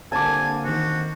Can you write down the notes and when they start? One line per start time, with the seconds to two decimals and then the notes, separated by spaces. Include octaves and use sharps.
0.12 D3 G3 A#3 C4 G#5 A5 D6
0.64 D#3 C4 F#4